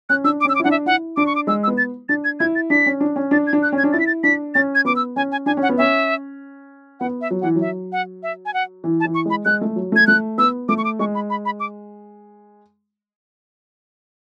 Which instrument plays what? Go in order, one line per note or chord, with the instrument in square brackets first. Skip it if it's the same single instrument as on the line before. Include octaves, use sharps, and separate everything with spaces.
[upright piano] C#4 [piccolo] F#6
[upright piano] D4 [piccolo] E6
[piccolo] D6
[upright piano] C#4 [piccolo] E6
[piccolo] D6
[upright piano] E4
[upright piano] D4 [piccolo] F#5
[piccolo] E5
[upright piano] E4 [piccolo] F#5
[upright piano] D4 [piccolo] D6
[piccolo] C#6
D6
[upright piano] G#3 [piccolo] E6
[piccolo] E6
[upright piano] B3
[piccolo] A6
[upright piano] D4 [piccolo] A6
[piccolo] G#6
[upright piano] E4 [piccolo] G#6
[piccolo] A6
[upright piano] D4 [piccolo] B6
[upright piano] C#4
D4
C#4
[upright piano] D4 [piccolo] A6
[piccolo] G#6
[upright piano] D4
[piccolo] F#6
[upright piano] C#4
[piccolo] G#6
[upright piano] D4
[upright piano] E4 [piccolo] A6
[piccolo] B6
A6
[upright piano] D4 [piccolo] B6
[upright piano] C#4 [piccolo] A6
[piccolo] G#6
[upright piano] B3 [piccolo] D6
[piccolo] E6
[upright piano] C#4 [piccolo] G#5
[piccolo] G#5
[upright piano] D4 [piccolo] G#5
[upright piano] C#4
[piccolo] F#5
[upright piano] B3
[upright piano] C#4 [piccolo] E5
[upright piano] B3 [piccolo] F#5
[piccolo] E5
[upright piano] F#3
[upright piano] E3 [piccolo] F#5
[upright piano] F#3
[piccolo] E5
F#5
E5
G#5
F#5
[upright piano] E3
[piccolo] A5
[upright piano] E3
[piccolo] C#6
[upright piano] G#3 [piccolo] B5
[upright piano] G#3 [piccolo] F#6
[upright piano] A3
F#3
[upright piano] A3 [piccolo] G#6
[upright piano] A3 [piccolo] F#6
[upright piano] B3 [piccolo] E6
[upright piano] A3 [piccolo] D6
[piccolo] C#6
D6
[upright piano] G#3 [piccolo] C#6
[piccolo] B5
B5
B5
D6